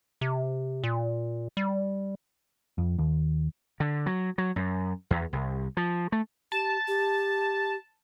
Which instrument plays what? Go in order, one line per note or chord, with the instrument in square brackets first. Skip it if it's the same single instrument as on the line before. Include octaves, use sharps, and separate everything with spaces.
[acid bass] C3
A#2
G3
[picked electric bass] F2
D#2
[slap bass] D3
F#3
F#3
F#2
E2
C2
F3
A3
[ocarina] G4 [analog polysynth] A5
[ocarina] G4